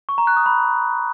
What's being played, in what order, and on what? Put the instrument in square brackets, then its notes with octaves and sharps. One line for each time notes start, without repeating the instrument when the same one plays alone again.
[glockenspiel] C#6
A#5
F#6
D#6
B5